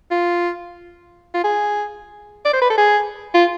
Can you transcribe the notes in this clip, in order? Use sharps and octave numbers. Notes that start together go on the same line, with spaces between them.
F4
F4
G#4
D5
C5
B4
A4
G#4
F4